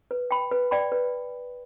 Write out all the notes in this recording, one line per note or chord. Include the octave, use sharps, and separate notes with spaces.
B4
G5 B5
B4
D5 G5 B5
B4